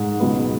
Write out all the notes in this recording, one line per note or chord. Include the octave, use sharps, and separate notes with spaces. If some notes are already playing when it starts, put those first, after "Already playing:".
Already playing: G#2
C#2 B2 F#3 B3